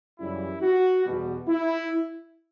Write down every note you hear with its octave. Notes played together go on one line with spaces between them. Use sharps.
F#2 C#3 E3 G3 E4
F#4
E2 B2 G3
E4